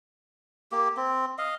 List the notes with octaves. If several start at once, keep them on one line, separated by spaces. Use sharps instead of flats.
A#3 G4
C4
D#5 F5